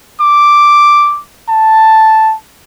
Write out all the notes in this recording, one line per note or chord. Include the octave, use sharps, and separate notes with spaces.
D6
A5